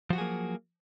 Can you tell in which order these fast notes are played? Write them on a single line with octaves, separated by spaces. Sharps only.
F3 F#4 F#3 G#4 A#3